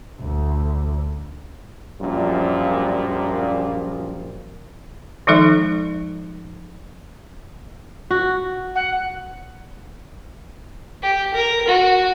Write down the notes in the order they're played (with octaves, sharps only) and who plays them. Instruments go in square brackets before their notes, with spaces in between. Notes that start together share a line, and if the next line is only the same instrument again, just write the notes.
[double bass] D2
[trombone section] A#1 F#2 A#2 F3 G3
[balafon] D#3 F3 G#3 D#4 A4 E5
[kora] F#4
[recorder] F#5
[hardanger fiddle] G4
A#4
F#4